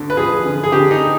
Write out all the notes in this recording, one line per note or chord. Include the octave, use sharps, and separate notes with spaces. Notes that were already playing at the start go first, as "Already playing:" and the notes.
Already playing: D2 D3
B4
F3 G#4
D3
G#4
D3 G4
D#4